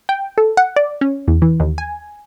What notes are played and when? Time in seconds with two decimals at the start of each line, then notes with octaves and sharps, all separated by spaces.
0.09 G5
0.38 A4
0.57 F#5
0.76 D5
1.01 C#4
1.28 E2
1.42 E3
1.60 D#2
1.78 G#5